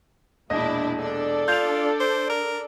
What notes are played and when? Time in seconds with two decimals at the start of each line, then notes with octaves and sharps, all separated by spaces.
0.50 E1 A#2 D4 E4 D#5
1.00 D4 A4
1.48 F4 G6 F7
2.00 C5
2.30 A#4